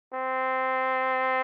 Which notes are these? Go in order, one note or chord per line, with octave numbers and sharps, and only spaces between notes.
C4